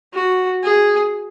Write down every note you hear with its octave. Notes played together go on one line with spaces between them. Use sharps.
F#4
G#4